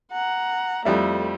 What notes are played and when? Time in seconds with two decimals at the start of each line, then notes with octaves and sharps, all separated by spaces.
0.12 F#5 A#5
0.85 F2 G3 A3 E4